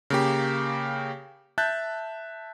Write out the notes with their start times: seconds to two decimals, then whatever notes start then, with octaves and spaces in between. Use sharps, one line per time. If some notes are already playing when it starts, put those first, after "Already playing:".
0.10 C#3 A#3 G4
1.58 E5 A5 F#6 G6 A6